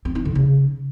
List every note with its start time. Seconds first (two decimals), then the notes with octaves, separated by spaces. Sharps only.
0.05 C4
0.15 D#4
0.25 D3
0.35 C#3